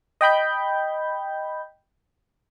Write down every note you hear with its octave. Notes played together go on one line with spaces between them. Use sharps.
D#5 G5 B5 G6